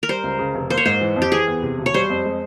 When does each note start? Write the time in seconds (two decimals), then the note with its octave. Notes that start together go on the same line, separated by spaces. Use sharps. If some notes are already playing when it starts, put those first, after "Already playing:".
0.03 A#4
0.09 G3 C5
0.24 C#2
0.39 C#3
0.55 F1
0.70 A#3 C5
0.77 C#5
0.86 G#2 C5
1.01 E3
1.16 F2
1.22 G4
1.32 E3 G#4
1.48 E2
1.62 C3
1.78 E1
1.86 C#5
1.94 G3 C5
2.10 F2
2.25 G#3